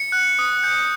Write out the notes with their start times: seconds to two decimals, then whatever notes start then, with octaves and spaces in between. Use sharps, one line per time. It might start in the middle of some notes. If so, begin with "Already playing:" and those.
Already playing: C#7
0.12 F#6
0.39 D#6
0.64 G6